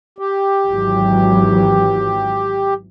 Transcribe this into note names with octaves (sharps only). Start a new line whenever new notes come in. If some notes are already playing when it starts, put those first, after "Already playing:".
G4
G#1 E3 F#3